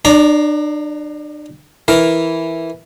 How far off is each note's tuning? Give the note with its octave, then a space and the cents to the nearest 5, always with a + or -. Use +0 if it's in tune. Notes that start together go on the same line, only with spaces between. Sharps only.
D4 +35 D5 -25 A#5 +0
E3 +0 A#4 +0